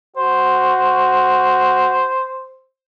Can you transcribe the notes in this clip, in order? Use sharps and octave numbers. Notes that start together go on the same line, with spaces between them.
F#4 C5